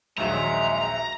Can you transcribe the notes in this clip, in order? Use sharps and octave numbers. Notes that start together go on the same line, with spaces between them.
A#1 D#2 F#3 G#3 E5 A#5